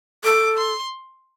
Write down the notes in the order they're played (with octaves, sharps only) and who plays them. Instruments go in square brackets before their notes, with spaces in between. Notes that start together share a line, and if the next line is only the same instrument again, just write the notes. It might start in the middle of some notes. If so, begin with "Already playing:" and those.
[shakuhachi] A4 [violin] D6
[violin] C6